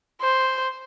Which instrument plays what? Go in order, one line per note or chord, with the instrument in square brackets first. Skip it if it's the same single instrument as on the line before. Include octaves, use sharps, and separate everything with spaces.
[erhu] C5